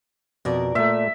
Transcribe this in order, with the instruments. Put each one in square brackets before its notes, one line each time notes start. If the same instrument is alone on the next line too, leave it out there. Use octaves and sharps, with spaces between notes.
[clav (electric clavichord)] F2 B2 [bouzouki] A#4 D5
[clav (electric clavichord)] A#2 A3 [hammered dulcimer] E5